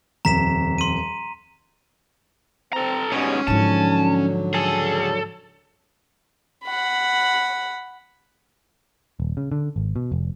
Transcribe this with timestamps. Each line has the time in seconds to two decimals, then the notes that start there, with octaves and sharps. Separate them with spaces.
0.25 D#1 F2 A#5 B6 E7
0.78 C6 D#7
2.73 C4 A4 A#5
3.12 G#2 B2 G3 C#4 G#4 C#5
3.47 G#2 D3 F3 F#3 A5
4.54 C#2 G#4 A4
6.65 F#5 B5
9.20 D#1
9.37 C#3
9.52 D3
9.76 G#1
9.96 B2
10.12 F1